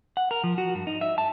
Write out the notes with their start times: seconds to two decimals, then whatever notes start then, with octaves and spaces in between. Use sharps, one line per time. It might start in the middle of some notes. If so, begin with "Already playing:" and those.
0.17 F#5
0.31 A#4
0.44 F3
0.58 F#4
0.75 G2
0.87 D#4
1.01 E5
1.18 A5